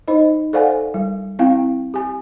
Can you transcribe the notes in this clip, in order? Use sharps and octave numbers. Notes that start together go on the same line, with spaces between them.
D#4 C5 D#5
A4 C5 D5 F5 F#5 G#5
G3
C4 E4 F5 G5
G4 G#5